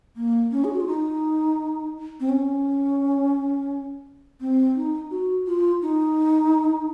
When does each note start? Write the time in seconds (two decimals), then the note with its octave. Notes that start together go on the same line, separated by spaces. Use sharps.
0.16 A#3
0.52 C#4
0.64 G#4
0.73 F#4
0.81 F4
0.87 D#4
2.20 C4
2.29 C#4
4.41 C4
4.76 D#4
5.11 F#4
5.47 F4
5.82 D#4